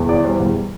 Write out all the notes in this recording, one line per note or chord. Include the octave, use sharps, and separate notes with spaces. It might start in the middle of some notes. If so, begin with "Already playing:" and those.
Already playing: E2
E3 D5
G3 C5
E2